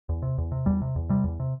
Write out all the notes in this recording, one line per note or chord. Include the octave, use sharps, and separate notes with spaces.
E2
C3
E2
C3
E2 G3
C3
E2
C3 G3
E2
C3